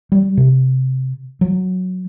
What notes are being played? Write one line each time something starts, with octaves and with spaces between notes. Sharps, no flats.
G3
C3
F#3